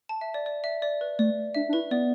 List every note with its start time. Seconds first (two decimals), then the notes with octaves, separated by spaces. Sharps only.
0.09 A5
0.21 E5
0.34 D5
0.46 D5
0.64 E5
0.82 D5
1.01 B4
1.19 A3 D5
1.55 D4 E5
1.69 D4
1.73 E4 B4
1.91 B3 D5